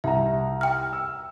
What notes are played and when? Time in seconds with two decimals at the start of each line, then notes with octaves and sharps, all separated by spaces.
0.04 C2 E5 A#5
0.61 G5 F6
0.93 E6